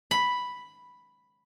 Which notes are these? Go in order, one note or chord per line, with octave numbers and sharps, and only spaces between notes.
B5